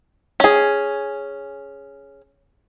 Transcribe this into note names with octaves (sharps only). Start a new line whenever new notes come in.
C#4 G#4